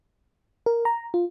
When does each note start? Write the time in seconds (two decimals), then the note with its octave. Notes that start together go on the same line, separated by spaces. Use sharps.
0.66 A#4
0.85 A#5
1.14 F4